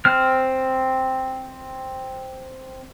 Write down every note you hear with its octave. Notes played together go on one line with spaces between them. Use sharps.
C4 F6